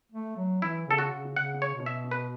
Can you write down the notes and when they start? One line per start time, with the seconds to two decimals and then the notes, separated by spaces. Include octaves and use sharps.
0.12 A3
0.37 F#3
0.62 E3 E4
0.87 C#3 A4
0.98 F#4
1.11 C#3
1.36 C#3 F#5
1.62 C#5
1.74 B2
1.86 E5
2.11 B4